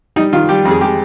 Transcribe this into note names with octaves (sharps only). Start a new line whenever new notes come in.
G3 D#4
D#3 F4
G3 G4
F2
G#4
G#3 G4